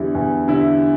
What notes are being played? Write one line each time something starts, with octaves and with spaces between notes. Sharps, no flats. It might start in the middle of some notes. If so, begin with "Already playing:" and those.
Already playing: E2 D3 G3 E4
E2
D3 G3 E4